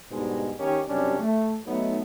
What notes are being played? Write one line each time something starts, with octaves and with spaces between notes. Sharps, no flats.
G#2 B2 D3 G3 G#3
D#3 A#3 C#4 D#4 G4
F#2 C3 G3 C#4 D4
A3
F#3 A3 B3 D#4